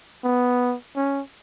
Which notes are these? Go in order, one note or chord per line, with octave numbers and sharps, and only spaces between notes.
B3
C#4